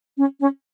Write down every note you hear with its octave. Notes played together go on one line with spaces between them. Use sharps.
C#4
C#4